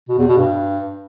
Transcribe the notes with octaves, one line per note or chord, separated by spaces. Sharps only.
B2
E2
B2
G2